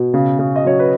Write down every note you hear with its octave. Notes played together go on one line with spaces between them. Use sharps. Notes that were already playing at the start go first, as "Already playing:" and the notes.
Already playing: B2
C#3
C#3
D#5
F#3 C#5
B4